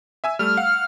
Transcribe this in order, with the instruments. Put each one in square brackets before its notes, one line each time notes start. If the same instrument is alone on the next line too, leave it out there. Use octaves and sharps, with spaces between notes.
[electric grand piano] E5 G#5 E6
[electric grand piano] G3 A3 [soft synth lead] F6
[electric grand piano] F5 F#5